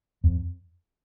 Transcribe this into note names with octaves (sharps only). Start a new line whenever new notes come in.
F2